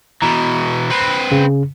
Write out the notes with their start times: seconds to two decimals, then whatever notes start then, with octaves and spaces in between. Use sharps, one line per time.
0.22 B2 E3 A#5
0.90 C4 B4
1.31 C#3